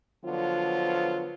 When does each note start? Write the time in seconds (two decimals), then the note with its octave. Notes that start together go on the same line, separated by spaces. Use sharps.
0.25 D3 F3 F#3 B3 F4